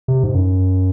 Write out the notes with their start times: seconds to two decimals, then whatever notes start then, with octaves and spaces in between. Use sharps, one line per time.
0.08 C3
0.24 G#2
0.34 F#2